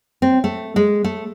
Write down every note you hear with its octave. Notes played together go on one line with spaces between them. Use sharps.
C4
A3
G#3
A3